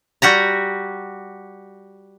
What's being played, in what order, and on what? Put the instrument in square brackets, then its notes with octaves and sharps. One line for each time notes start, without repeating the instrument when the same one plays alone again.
[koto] G3 F#4 G4 A#5